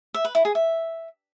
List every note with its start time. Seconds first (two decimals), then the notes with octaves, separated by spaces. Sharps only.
0.14 E5
0.25 B4
0.35 E4
0.45 G#4
0.55 E5